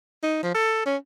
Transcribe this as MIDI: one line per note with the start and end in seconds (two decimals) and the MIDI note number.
0.23 0.39 63
0.43 0.52 53
0.55 0.82 69
0.86 0.96 61